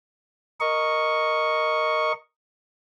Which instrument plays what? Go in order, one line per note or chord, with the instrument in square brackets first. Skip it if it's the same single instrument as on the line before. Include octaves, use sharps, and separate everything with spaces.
[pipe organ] A#4 D#5 C#6